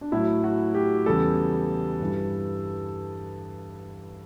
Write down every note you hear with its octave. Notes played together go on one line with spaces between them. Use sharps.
D4
A2 F#3 A3 E4
F#4
G4
E2 C#3 G3 A4
G2 E3 G3